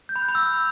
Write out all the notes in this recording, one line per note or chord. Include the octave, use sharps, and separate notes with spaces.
G6
B5
F#6
B5
E6